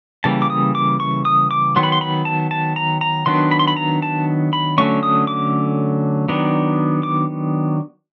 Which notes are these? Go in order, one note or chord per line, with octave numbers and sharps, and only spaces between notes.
C#3 E3 G3 A#3 A5
D6
D#6
D6
C#6
D#6
D6
D#3 F#3 B3 C6
B5
C6
B5
A5
A5
A#5
A#5
D#3 F#3 B3 D4 C6
B5
C6
B5
A#5
A5
B5
D3 F#3 A3 C#4 C#6
D#6
D6
D#3 F#3 B3 D4
D6